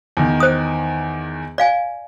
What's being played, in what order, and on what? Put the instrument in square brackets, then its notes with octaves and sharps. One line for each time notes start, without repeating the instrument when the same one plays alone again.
[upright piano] E2 D#3
[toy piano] C5 D#6
D5 F5 G#5